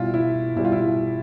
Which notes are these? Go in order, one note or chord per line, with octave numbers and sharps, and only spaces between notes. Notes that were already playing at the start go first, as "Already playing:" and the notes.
Already playing: B2 G3 E4 F4
E4
B2 G3 E4
F4
E4